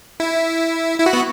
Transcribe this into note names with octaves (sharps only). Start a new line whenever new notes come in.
E4
E4
F#4
B3